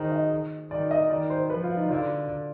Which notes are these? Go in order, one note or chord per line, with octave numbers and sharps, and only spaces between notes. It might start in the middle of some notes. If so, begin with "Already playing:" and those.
Already playing: D#3 G#4 C5
D#5
D#3 D5
D#5
D#3 D5
C5
F3 B4
F4
D#4
D3 F4